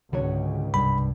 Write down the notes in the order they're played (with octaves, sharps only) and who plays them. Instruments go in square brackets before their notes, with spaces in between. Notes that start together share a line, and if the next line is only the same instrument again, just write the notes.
[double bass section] C#2 G#2 [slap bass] D3 C#4 [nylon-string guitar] F#4 C#5
[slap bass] C2 [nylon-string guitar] G2 [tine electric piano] B5